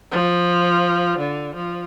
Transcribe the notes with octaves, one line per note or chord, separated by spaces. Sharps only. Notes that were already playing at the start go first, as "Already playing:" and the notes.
F3
D3
F3